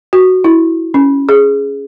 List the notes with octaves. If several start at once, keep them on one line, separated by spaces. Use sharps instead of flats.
F#4
E4
C#4
G#4